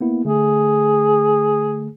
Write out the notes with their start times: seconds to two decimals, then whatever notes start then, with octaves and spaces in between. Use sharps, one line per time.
0.01 A#3 B3 E4
0.25 D3 A3 G#4